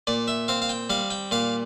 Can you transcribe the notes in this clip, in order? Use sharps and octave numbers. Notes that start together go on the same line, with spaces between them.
A#2 D5
E5
C4 F5
F5
G5
G3 F5
G5
A#2 F5